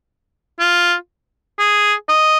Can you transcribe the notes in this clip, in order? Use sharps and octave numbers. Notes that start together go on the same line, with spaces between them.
F4
G#4
D#5